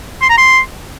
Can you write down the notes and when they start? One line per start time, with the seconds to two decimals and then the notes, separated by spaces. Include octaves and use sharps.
0.22 C6
0.30 A#5
0.38 C6